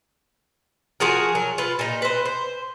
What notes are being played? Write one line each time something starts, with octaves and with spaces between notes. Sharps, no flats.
F3 F#4 G#4 A#4
F#3 A#4
F4 B4
A#2 D#4
B4 C5
C5